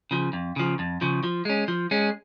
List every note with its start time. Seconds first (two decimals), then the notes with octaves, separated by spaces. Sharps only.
0.11 C#3 F3
0.33 F2
0.56 C#3 F3
0.79 F2
1.01 C#3 F3
1.23 F3
1.45 G#3 C#4
1.68 F3
1.91 G#3 C#4